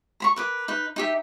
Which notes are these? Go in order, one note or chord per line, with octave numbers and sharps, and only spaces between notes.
A#5 B5 C#6
A#4 B4 D6
D#4 B4
D#4 G4 E5